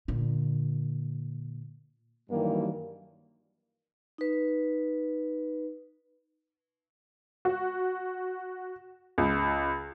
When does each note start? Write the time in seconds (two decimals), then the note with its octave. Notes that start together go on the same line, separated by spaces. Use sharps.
0.08 A#2 D3
2.30 G2 D#3 E3 F#3 G3 A#3
4.18 D#4 B4
7.45 F#4
9.18 C#2